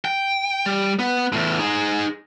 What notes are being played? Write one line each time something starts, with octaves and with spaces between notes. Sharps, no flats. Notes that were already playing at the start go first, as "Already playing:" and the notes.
G5
G3
B3
E2 A2
D#4 G#4